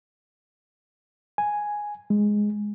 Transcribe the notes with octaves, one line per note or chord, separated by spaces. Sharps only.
G#5
G#3